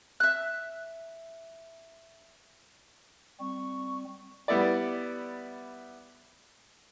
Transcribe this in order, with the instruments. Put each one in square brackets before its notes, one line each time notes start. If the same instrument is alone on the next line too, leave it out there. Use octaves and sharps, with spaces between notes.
[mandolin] E5 F#6
[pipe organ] G3 C4 [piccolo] C#6
[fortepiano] G3 B3 E4 D5